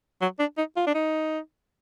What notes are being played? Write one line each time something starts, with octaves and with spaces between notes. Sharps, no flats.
F#3
D4
D#4
F4
D4
D#4